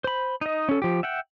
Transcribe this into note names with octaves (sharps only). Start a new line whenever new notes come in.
C5 B5
D#4 D#5
C#4 A4
F3 G4
E5 F#5 G5